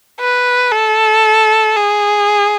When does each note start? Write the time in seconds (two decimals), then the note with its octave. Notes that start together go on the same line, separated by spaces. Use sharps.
0.20 B4
0.72 A4
1.76 G#4